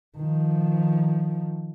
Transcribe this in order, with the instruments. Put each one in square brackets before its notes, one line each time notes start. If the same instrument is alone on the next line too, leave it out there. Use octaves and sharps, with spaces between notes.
[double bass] D#3 F3